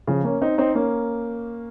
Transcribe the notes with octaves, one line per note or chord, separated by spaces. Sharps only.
C#3 F3
A#3 C#4
C4 D#4
C4 D#4
A#3 C#4